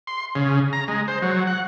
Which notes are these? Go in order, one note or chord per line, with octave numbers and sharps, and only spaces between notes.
C6
C#3
A#5
G#3
C5
F#3
F#5